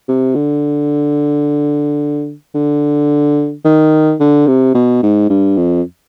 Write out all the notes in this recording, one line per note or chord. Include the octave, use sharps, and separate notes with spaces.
C3
D3
D3
D#3
D3
C3
B2
G#2
G2
F2